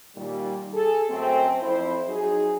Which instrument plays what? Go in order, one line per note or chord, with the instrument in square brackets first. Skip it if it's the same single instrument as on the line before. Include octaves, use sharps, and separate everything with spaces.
[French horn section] A#2 D#3 G3
G#4 A4
F#2 A3 C4
F2 E4 C5
F#3 D#4 G#4